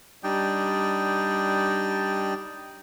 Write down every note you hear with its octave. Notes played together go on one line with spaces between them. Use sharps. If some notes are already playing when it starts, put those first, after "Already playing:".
G3 D4 D#4 G5